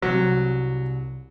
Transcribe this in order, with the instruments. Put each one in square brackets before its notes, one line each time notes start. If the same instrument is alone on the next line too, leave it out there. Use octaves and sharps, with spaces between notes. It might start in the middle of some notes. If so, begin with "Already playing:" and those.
[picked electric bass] C2 C3 [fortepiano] F#3